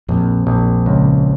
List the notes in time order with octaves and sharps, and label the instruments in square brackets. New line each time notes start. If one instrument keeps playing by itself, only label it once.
[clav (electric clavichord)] A#1 [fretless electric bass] F2
[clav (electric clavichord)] A#1
C#2